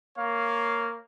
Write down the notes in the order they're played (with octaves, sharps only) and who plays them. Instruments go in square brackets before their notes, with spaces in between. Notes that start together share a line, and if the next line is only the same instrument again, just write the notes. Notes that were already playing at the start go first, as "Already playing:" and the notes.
[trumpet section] A#3 C#5 F5